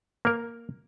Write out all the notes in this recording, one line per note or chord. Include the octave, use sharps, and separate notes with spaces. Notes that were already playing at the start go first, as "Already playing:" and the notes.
A#3 A#4